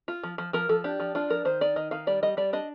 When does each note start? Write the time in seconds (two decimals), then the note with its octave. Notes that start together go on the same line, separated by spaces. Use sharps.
0.08 F4
0.23 F3
0.38 F3
0.53 F3 A#4
0.69 F3 A4
0.84 D4 G4
1.00 F3
1.15 D4 F4
1.30 F3 A#4
1.45 D#3 C5
1.61 D#4 D5
1.76 D#3 D#5
1.91 D#3 F5
2.07 G3 D5
2.23 G3 D#5
2.37 G3 D5
2.53 D4 D#5